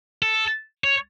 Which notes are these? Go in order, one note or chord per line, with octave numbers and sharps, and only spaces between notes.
A4
C#5